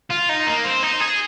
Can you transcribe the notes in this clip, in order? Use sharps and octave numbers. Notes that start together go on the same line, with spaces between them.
F4
D#4
A#3
C4
D#4
G#4